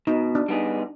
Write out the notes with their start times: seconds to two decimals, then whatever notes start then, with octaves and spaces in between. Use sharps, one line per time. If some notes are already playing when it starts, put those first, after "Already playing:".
0.07 B2 D#4
0.35 D4
0.48 G3 B3 D#4 G#4